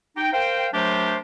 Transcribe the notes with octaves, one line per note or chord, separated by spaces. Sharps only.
D#4 G5
A#4 C5 F5 G5
F#3 A3 D4 G4 A#4 C5